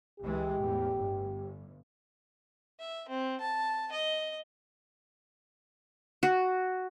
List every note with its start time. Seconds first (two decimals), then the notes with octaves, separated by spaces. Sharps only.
0.20 C#2 E3 G#3 G4
0.59 E2 A2
0.96 G1
2.80 E5
3.09 C4
3.40 A5
3.92 D#5
6.23 F#4